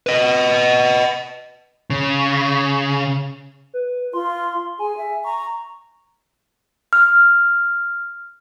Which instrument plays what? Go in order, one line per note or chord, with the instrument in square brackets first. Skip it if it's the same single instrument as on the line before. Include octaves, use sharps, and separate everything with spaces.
[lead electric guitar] B4 D#5
C#3
[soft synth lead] B4
[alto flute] F4 [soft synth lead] C6
[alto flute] G#4 [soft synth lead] G#5
[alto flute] E5
[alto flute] A#5 [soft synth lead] C#6
[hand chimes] F6